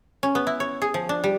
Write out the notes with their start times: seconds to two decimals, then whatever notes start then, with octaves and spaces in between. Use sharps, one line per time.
0.23 C#4
0.35 B3
0.47 E4
0.60 C#5
0.82 G#4
0.94 F3
1.09 D4
1.24 G3